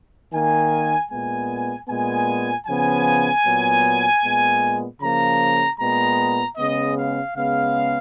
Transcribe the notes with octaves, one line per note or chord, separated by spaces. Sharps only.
D#3 A#3 G#5
A#2 G#3 B3 G#5
A#2 G#3 B3 G#5
C#3 F3 B3 G#5
A#2 F#3 B3
A#2 G#3 B3
C#3 F3 A#3 A#5
A#2 G#3 B3 A#5
C#3 G#3 B3 D#5
F5
C#3 G#3 B3 F5